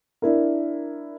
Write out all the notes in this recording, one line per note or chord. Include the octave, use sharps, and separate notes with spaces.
D4 E4 A#4